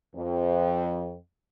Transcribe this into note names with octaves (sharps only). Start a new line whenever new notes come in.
F2